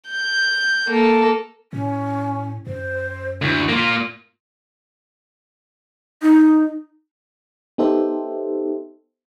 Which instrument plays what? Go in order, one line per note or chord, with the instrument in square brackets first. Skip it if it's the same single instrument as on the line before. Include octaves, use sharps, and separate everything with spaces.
[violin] G6
A#3 A4
[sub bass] A2 [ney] C#4
[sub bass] F#2 [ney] C5
[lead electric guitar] D2 [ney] E4
[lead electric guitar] A#3 F4 [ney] A#4
[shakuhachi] D#4
[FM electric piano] B3 D#4 G4 A4 C5 E5